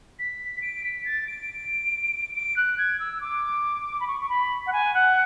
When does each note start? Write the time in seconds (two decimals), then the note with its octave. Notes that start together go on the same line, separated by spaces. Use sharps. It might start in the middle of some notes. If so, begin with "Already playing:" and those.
0.19 B6
0.62 D7
0.84 B6
1.05 A6
1.27 D7
2.35 D7
2.56 F#6
2.78 G#6
3.00 E6
3.21 D6
4.00 B5
4.07 C#6
4.20 C#6
4.29 B5
4.67 F#5
4.73 G#5
4.94 F#5